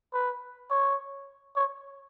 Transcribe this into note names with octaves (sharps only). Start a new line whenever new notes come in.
B4
C#5
C#5